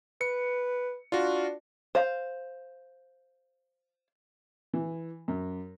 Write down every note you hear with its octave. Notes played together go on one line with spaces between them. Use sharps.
B4 C#7
D4 F4 F#4
C5 F5
E3
F#2